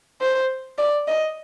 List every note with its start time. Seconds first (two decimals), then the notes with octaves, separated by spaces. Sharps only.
0.21 C5
0.78 D5
1.08 D#5